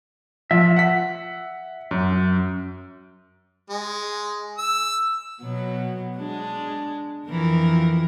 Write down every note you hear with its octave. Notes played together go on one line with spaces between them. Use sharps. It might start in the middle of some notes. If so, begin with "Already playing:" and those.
F3 E5
F#5 B6
F#2
G#3
E6
B2 F#3 B3
G#3 D4
F2 E3 A#4